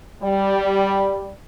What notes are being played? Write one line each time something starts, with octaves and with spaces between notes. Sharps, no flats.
G3